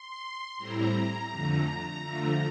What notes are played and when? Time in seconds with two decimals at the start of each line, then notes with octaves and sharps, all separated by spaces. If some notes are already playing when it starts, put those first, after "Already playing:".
Already playing: C6
0.57 A2 G3 C4 E4 A#5
1.30 F2 D3 A3
2.03 D3 F3 A3